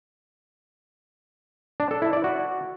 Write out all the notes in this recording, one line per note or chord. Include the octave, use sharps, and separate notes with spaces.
D4
A4
E4
D5
F#4